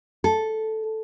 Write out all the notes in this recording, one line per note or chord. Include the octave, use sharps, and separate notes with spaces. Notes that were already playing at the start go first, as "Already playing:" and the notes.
A4